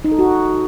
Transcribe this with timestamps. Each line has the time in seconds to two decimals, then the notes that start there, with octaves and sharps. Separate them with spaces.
0.05 D#4
0.12 A4
0.19 F#4